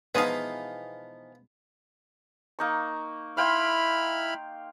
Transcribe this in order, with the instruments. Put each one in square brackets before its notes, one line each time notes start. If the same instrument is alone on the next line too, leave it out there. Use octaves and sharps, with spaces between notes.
[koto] B2 G#3 G#4 [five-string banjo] E3 F3 D#4 [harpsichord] B3 F5
[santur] A#3 D#4 C#6
[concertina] E4 B5 F6 [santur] F5 G5 C6